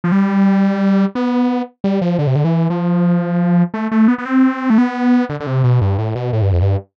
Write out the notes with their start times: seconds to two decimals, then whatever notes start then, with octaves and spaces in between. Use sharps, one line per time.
0.04 F3
0.12 G3
1.15 B3
1.84 G3
2.01 F3
2.19 D3
2.27 C3
2.36 D3
2.44 E3
2.70 F3
3.74 A3
3.91 A3
4.08 B3
4.18 B3
4.25 C4
4.70 A3
4.78 B3
5.29 D3
5.40 D3
5.47 C3
5.64 B2
5.81 G2
5.98 A2
6.15 B2
6.33 A2
6.42 G2
6.53 F2
6.62 G2